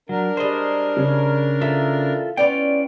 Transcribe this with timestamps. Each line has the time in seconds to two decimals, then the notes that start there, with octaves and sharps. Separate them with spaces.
0.09 F#3 D4 A#4
0.37 G3 G#3 C5 D#5
0.97 C#3 C#4
1.61 E3 F4 A4 E5
2.37 B3 C#4 E4 F4 D5 G5